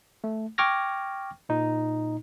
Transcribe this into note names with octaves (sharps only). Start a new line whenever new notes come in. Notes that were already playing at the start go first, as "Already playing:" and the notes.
A3
G5 C#6 D6 F6 G#6 A#6
A#2 D#4